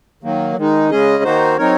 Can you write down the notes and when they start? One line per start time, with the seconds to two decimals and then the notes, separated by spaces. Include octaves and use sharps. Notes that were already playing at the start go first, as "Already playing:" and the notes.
0.23 D#3 F#3 A#3
0.57 D#3 G#3 D#4
0.90 C#3 G#3 C#4 G#4 D#5
1.23 D#3 A#3 D#4 F#4 C5
1.57 F#3 C4 D#4 A#4 C#5